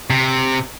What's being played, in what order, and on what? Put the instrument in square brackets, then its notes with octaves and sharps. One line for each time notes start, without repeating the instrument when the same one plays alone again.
[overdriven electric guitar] C3